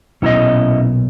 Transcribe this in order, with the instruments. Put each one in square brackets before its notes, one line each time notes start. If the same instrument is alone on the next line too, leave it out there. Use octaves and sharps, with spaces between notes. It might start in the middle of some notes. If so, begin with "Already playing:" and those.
[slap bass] B1 A#2 [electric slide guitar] C#4 E4 D#5